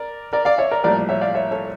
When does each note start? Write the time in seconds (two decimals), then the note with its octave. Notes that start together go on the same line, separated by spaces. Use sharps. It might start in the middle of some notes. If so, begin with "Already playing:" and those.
Already playing: A#4 D5
0.33 A#4 D5
0.45 D5 F5
0.58 C#5 E5
0.71 A#4 D5
0.84 A#1 A2 G3 A#3 A#4 D5
1.09 C#5 E5
1.21 D5 F5
1.35 C#5 E5
1.51 A4 C#5